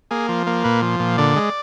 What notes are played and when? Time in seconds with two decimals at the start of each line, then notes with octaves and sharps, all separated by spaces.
0.11 A#3 G#4
0.29 F3
0.47 A#3
0.64 A#2 B4
0.82 F3
1.00 A#2
1.18 D3 D5
1.36 G#3